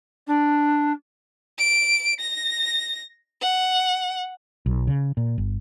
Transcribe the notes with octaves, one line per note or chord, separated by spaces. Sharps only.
D4
D7
A#6
F#5
B1
C#3
A#2
G1